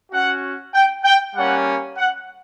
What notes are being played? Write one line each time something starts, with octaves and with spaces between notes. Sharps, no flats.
C#4 F#4 F#5
G5
G5
G3 A#3 C#4 F#5
F#5